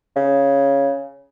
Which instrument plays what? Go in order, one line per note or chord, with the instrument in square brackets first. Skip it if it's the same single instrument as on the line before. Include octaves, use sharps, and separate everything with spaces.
[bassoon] C#3